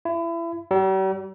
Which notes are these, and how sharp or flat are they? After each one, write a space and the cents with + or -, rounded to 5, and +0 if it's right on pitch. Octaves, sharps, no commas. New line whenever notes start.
E4 +30
G3 -45